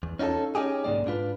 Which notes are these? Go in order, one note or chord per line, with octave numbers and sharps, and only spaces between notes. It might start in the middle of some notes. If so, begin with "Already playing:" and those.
E2
C#4 D#4 F4 G4 A4
C#4 D#4 G4 G#4
B1 G#2 D3 F#3 A#3 D5
G#2 D4 F4 B4